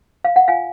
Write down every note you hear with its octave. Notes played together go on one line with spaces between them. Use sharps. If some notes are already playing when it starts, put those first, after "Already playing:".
F5
F#5
F4 F5 G#5